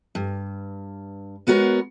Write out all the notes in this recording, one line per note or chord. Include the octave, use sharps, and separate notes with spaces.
G2
G#3 B3 F#4 A#4 C#5